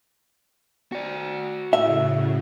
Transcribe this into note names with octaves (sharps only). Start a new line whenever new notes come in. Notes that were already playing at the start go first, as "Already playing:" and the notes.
F#4 D5
A2 C#3 E5